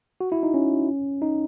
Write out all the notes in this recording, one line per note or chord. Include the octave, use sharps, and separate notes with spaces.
F#4
E4
D#4
C#4
D#4